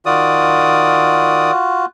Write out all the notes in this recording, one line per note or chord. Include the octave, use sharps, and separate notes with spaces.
D#3 F4 F#4 D5 D#6